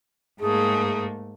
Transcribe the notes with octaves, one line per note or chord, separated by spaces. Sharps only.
G#2 A3 A#3 G#4